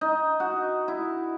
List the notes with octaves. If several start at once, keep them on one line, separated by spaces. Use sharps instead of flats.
D#4
F#4
E4